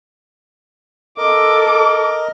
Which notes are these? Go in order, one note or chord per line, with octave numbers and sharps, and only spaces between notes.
A4 A#4 D#5 D6